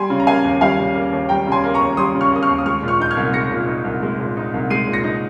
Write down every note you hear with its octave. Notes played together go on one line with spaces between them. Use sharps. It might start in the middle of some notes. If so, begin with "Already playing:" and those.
Already playing: G3 G#5 C6
C#3
A#5
A#3 F5 G#5
D#2
G3 F5 G#5
C#3
A#3
D#2
G3 G5 A#5
C#3 G#5 C6
A#3
A#5 C#6
D#2
G3 C6 D#6
C#3
C#6 F6
A#3 D#6
C#6 F6
D#2
D#6
G#3 C#6 F6
A#2
C#6 F6
D#4 G6
F6 G#6
C2
G#3 A#6 C#7
A#2
D#4
C2
G#3
A#2
D#4
C2
G#3 C7 D#7
A#2
A#6 C#7
D#4